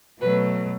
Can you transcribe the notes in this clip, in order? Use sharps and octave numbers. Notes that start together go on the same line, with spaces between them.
B2 F#3 A3 B4